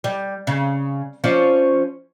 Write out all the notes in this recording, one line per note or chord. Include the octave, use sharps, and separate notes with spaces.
G3
C#3
F3 C#4 D5